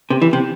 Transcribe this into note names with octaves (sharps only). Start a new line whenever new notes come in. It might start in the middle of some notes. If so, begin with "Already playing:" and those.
C3
E3
C3